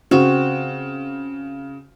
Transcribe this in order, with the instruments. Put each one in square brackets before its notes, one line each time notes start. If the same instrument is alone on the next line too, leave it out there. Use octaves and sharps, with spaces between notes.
[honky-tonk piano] C#3 [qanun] C4 F#4